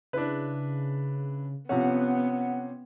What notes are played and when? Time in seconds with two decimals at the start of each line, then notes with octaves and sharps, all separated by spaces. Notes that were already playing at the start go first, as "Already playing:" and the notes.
0.13 C#3 D4 E4 B4
1.69 C3 F3 B3 C#4 F#5